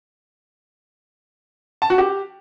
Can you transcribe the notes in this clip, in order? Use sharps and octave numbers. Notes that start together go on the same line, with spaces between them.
A5
F#4
G4